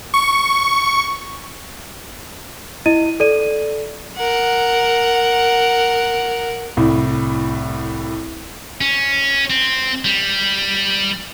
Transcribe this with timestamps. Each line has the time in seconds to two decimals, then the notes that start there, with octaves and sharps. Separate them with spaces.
0.14 C#6
2.86 E4 D#5 D#7
3.20 A4 D5 D#7
4.16 A#4 F#5
6.77 C2 A2
8.81 C#4
9.50 C4
10.05 G3